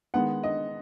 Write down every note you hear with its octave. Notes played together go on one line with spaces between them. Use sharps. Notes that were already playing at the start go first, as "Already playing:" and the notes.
D#3 G#3 B3 F#5
D#5